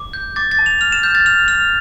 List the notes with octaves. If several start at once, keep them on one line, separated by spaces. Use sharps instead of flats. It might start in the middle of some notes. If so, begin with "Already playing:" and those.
Already playing: D6
G6
D6 A6
A6
A5
F7
F6 F7
E7
F6 G6
A6
F6 F7
F6 F7